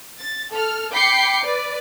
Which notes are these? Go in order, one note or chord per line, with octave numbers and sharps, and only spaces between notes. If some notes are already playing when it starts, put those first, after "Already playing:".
A6
A4 F6
G5 B5 D6 G6 C7 C#7
B4 D5